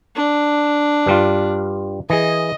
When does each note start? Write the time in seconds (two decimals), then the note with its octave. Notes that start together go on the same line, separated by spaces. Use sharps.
0.16 D4
1.06 G2 G3 F4
2.10 E3 G#4 D#5